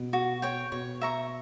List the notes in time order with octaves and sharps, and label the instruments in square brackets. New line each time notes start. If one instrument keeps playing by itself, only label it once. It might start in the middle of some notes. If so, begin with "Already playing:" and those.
Already playing: [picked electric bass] B2
[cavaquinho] F#4
C#5 G5
[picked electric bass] B2 [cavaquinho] C#5
[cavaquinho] E5 A#5 C#6